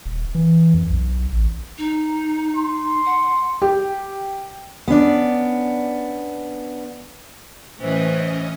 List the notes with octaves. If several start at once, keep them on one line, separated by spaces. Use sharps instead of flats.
D#1
E3
F2
B1
A1
D#4
C6
F#5
G4
B3 C#4 D4 D5
A2 E3 C#4 C5 D#5